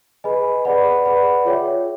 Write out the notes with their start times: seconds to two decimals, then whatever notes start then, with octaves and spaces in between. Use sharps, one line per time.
0.24 G#4 B4 D#5 G#5 B5
0.65 G#4 B4 D5 F#5 B5
1.05 G#4 B4 D5 F#5 B5
1.45 F4 G#4 C#5 E5 G5